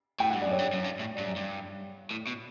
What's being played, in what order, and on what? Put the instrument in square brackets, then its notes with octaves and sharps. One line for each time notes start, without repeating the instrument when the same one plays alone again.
[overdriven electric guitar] A2 [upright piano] G5
[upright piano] F#5
[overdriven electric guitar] G2
[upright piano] D5
[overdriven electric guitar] F#2
[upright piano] C#5
[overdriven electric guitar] G2
F#2
G2
A2
[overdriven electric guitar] G2 [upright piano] D5
[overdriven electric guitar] F#2
G2
A2
B2